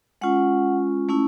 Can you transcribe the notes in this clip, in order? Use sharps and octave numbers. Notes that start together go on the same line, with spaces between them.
G#3 C#4 F4 F#5
A3 C#4 E4